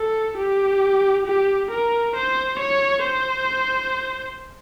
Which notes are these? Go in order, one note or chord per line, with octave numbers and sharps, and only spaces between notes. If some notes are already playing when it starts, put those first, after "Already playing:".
Already playing: A4
G4
G4
A#4
C5
C#5
C5